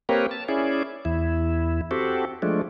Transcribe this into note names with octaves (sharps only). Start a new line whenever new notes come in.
A#3 C4 G4 A#4 B4 C#5
A5
C#4 E4 G#4 D5
E2 E4
C4 F#4 G4 A4
F3 G#3 A3 D4